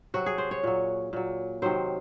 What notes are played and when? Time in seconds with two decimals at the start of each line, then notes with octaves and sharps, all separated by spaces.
0.14 C3 F#3 F#4
0.26 G#4
0.38 C5
0.51 C#5
0.63 A#2 F#3
1.13 A#2 F#3
1.62 C3 D#3 F#3 C5